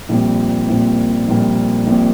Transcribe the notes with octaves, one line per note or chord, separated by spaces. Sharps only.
A#1 A#2 G3 C4
A#1 A#2 G3 C4
A#1 A#2 G3 C4
A#1 A#2 G3 C4